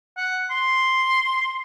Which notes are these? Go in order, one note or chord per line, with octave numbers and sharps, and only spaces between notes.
F#5
C6